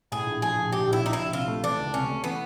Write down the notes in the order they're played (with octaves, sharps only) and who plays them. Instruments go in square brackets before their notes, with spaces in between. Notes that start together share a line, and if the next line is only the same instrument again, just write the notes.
[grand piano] A2 [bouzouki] G#4
[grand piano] A#1
[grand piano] F3 [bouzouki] G#4
[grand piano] A#1
[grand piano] A2 [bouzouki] G4
[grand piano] A#1
[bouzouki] E4
[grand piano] F3 [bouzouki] D#4
[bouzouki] E4
[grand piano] A#1
[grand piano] C3 [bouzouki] F4
[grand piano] A3
[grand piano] E3 [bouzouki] D4
[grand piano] C#2
[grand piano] C3 [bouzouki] C#4
[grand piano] A3
[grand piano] E3 [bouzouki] B3